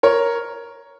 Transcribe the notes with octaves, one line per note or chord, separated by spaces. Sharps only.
A#4 C#5